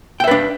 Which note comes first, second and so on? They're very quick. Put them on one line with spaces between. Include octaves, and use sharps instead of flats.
G5 E5 B4 D4